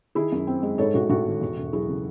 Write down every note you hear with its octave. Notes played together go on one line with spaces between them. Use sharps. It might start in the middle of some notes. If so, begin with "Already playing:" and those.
D#3 E4 G#4
F#2
C4
G#3
G#2 A4 C#5
A1 F#4 A4
A1 F#4 A4
D#3
E2
E1
F#3 E4 G#4
C#3